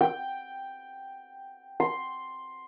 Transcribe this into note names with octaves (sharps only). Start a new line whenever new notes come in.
G5
C6